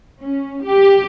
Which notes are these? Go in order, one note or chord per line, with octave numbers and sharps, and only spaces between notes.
C#4
G4